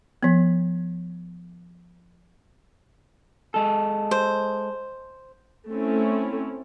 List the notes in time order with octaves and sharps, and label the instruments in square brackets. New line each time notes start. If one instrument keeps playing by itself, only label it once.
[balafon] F3 B3
[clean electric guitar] G#3 A4
[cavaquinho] C5
[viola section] A3 C4 C#4 E4